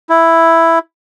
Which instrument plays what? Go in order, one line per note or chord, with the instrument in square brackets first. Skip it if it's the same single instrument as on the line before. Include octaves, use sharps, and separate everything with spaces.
[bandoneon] E4